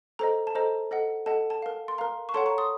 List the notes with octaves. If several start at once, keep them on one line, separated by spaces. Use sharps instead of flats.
A4 C5 D#5 A#5
A5
A4 C5 D#5 A#5
A4 D#5 F#5
A4 D#5 F#5 A5
A5
A#4 F5
C6
A#4 F5 A#5
C#6
A4 C#5 F#5 A5 C6
A#5 C#6
C6 D#6